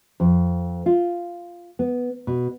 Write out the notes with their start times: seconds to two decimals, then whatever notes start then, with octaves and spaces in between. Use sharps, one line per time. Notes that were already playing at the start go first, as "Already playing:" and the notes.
0.20 F2
0.86 F4
1.79 B3
2.27 B2